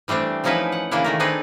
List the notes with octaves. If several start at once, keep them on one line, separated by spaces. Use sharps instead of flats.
E3 G3 A3 C4 D4
E3 F3 C#4 D#4 E4 B4
F#5
C#3 E3 A#3 D4 E4
D#3 A3 A#4
C4 D4 D#4 G#4 B4